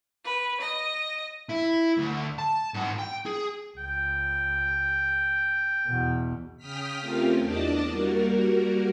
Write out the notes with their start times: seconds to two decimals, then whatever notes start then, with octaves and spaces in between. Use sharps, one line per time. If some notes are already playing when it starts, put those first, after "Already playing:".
0.23 B4
0.60 D#5
1.49 E4
1.98 D2
2.39 A5
2.74 G#2 F#4
2.98 G5
3.26 G#4
3.78 C#2 G5
5.87 E2 B2
6.57 C#3 G5 D#6 F6 B6
7.00 A3 C4 C#4 F4 G4 A#4
7.39 E2 D4 D5 D#5 A5
7.89 G3 A#3 F#4 A#4